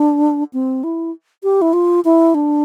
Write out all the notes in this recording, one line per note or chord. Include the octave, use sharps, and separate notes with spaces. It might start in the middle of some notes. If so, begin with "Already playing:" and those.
Already playing: D4
C4
E4
G4
E4
F4
E4
D4